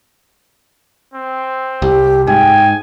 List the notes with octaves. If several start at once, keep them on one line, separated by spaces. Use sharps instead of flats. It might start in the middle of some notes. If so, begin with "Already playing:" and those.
C4
C2 G4
G#2 G5 G#5